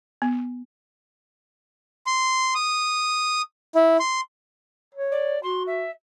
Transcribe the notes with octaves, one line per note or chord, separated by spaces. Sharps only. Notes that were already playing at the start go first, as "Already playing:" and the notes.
B3
C6
D#6
E4
C6
C#5
D5
F#4 C6
E5